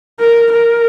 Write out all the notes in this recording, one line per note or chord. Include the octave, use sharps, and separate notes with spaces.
A#4
A#4